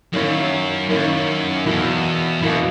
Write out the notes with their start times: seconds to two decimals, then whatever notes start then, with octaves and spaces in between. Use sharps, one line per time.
0.13 F#2 D#3 A#3 C#4 E4
0.89 F#2 D#3 A#3 C#4 E4
1.66 E2 B2 A#3 E4
2.42 F#2 B2 A#3 E4